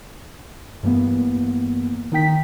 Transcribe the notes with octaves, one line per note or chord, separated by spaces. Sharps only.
G2 E3 A#3 B3
D#3 D#4 G5 B6